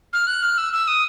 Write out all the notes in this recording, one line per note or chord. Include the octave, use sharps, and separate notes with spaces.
F6
F#6
F6
E6
E6
D#6